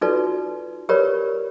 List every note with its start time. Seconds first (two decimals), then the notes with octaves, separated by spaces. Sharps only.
0.01 D#4 F4 F#4 A4 B4 D5
0.89 G4 A#4 B4 C#5 D5 B5